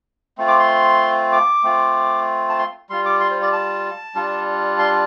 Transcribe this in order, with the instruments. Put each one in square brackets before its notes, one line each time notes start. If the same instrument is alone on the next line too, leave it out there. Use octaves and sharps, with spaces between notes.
[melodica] A3 C4 F4
D6
C6
D6
A3 C4 F4
A5
C6
G3 F4 C6
D6
C6
C5
D5
A5
G3 D4 F4
C6